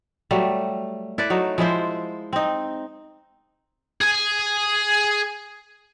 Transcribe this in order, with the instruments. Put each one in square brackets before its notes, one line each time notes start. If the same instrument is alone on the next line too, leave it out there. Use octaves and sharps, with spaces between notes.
[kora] F#3 G3 A3
E4 A4 B4 D5
F#3 A3 D#4
F3 G#3 E4 C5
C4 D#4
[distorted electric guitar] G#4 G#5